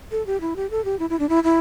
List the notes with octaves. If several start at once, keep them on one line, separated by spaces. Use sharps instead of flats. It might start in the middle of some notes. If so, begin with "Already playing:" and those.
A4
G4
E4
G4
A4
G4
E4
E4
D4
E4
E4